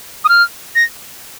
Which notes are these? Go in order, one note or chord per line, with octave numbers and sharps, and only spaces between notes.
D#6
F6
A#6